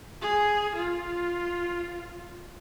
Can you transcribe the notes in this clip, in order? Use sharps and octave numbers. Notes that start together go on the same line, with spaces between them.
G#4
F4